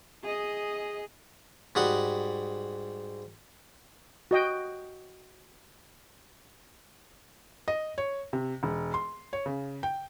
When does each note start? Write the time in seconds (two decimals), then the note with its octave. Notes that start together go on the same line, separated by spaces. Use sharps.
0.23 G#4 D#5
1.75 G#2 G3 F#4 F#5 D#6
4.31 F#4 D#5 G5
7.68 D#5
7.98 C#5
8.33 C3
8.63 E1
8.94 C6
9.33 C#5
9.46 C#3
9.83 G5